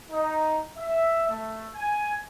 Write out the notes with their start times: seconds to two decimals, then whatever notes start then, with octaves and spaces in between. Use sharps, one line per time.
0.11 D#4
0.77 E5
1.29 A3
1.73 G#5